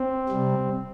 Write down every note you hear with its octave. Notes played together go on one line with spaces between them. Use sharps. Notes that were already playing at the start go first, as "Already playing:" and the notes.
Already playing: C4
C3 G3